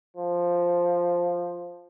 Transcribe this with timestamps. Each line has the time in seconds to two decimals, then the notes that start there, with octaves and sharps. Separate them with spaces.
0.17 F3